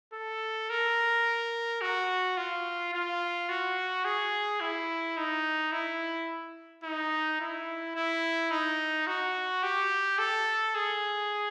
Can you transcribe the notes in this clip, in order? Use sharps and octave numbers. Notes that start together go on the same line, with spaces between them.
A4
A#4
F#4
F4
F4
F#4
G#4
E4
D#4
E4
D#4
E4
E4
D#4
F#4
G4
A4
G#4